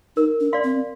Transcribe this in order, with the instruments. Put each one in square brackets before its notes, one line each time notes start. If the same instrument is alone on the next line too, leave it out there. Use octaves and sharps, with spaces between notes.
[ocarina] D#4 [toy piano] A#4
[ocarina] D4
[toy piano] D5 F5 C6
[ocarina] C4